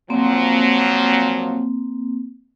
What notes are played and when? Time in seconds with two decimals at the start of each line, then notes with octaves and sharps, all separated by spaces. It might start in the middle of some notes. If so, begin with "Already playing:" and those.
0.10 A#2 F3 F#3 A#3 C4